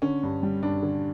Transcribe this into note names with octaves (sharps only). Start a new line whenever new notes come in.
D3 C#4
G2
G3
G2 D4
D3